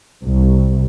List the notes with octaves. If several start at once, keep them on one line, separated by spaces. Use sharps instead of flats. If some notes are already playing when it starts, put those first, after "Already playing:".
C2